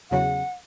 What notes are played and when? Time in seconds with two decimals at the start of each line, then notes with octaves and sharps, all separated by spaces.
0.11 E2 C#3 F#3 F#5